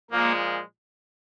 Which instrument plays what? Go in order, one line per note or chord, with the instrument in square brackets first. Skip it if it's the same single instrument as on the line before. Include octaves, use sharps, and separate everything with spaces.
[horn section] A#2 F3 G#3 [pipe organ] A#3